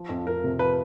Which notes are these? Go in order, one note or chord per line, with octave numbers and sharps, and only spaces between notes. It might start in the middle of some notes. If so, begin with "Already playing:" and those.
Already playing: F3
F2
F2 A#4
C3
F3 B4